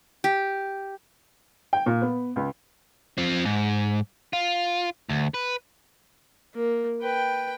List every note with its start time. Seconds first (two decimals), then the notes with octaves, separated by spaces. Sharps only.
0.24 G4
1.73 G5
1.86 A#2
2.02 B3
2.36 C#2
3.18 F3 C4
3.45 G#2
4.33 F4
5.09 D2
5.34 B4
6.55 A#3
7.02 B4 G5